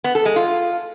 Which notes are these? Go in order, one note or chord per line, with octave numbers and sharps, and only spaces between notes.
B3
A4
G#3
F4